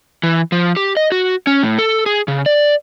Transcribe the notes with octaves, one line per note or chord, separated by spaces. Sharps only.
E3
F3
G4
D#5
F#4
C#4
A2
A4
G#4
C#3
D5